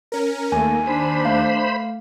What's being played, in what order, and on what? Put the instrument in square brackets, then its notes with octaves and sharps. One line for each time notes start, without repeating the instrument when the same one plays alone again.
[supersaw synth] C#4 A#4
[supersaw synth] D#2 [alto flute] A3 [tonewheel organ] A#3 [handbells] G#5
[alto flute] D4 [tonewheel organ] C5 B5
[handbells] A3 F5